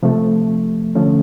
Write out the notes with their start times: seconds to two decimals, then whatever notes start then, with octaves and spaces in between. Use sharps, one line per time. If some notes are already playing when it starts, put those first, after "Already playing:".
0.03 C3 F3 A3
0.95 D3 F3 A3 C#4